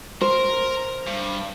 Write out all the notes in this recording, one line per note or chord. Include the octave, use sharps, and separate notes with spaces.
A#4 C5
G2